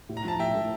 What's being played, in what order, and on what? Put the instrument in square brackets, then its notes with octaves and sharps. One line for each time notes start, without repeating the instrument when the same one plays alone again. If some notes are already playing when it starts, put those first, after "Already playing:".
[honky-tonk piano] A2
[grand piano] A#5
[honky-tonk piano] F3 [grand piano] A5
[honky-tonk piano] A2 [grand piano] E5 G5
[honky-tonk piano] A3